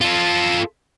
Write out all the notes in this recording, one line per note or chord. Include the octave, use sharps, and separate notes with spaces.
F4 A4